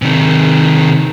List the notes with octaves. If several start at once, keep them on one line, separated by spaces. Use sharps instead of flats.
C3 D#3